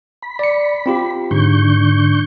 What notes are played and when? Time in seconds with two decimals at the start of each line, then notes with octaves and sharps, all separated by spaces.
0.22 B5
0.39 D5 C#7
0.86 C4 F4 G4
1.31 G#2 D3 C#6 G6